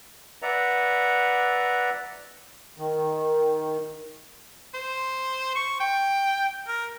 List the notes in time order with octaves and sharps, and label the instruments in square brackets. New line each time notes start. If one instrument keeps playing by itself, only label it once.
[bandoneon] B4 D5 E5 F#5 A#5
[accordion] D#3
[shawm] C5
C#6
G5
A#4